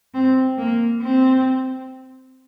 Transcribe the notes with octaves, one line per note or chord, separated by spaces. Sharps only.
C4
A#3
C4